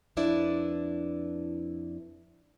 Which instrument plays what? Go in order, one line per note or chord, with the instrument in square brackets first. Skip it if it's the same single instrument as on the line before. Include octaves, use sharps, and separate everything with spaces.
[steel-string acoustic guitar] F2 D4 E4 B4 D5